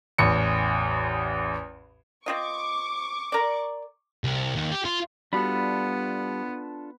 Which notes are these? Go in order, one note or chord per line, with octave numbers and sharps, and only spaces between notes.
A1 E2 C#7
C4 F4 D#5 C#6 D6
A#4 D5
C2
D#2
G4
F4
G3 B3 D4 F4 F#4 A4 B5